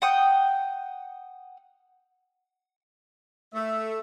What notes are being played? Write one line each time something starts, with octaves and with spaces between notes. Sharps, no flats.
F#5 G5 D#6
A3 E5